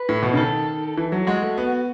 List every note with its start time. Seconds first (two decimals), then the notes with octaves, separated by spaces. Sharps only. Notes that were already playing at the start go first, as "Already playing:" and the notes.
Already playing: B4
0.09 A2
0.22 B2
0.33 C#3
0.37 D#3 A4
0.98 E3
1.12 F#3
1.27 G#3 F#4
1.42 A3
1.58 B3